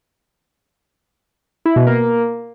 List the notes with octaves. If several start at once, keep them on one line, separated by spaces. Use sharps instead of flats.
E4
B2
A#3